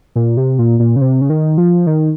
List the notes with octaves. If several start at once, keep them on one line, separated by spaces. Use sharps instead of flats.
A#2
C3
A#2
A#2
C#3
C3
C#3
D#3
F3
D#3